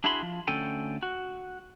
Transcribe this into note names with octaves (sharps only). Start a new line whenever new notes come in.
D4 E4 F#4 G#4 B5 C6
F3
D2 C#4 A4 G5 G#5
F#4